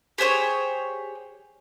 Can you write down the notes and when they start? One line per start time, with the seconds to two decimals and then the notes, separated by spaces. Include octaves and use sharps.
0.18 G4 G#4 C5 C#5